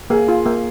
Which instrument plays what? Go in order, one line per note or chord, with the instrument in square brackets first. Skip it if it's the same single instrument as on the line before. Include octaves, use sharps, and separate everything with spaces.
[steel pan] A#3 [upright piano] G#4
[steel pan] F4
A#3